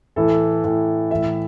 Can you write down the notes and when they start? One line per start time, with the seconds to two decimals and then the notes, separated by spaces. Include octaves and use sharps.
0.16 A2 E3 A4
0.64 A2 E3
1.11 A2 E3 E5